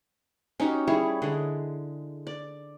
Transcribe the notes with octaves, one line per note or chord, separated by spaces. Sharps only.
C#4 D#4 F#4 G4
G3 E4 G#4 C#5
D3 G#3
D5